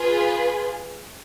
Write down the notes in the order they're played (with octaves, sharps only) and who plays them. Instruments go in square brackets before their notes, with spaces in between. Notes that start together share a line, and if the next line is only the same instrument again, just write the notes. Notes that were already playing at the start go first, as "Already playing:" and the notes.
Already playing: [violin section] F4 G#4 B4